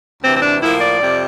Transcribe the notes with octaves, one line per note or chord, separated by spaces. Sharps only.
D2 C3 E3 C4
C4
D4
A2 F3 A#3 E4
D5
F2 C3 G3